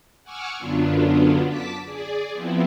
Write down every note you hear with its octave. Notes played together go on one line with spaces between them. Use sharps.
F#5 G#5 C#6 D6 E6 F6
F#2 D3 F#3 B3 D4 F4
A5 D6 B6
G#4 D5
F3 B3 C4 E4